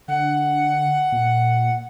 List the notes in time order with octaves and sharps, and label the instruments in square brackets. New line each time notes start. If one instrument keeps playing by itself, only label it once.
[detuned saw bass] D3 [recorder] F#5
[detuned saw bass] A#2